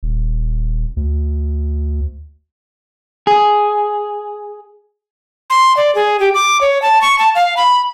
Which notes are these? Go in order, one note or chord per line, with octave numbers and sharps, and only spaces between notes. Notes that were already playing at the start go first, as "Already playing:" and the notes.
D#1
D2
G#4
C6
D5
G#4
G4
D6
C#5
A5
C#6
A5
F5
B5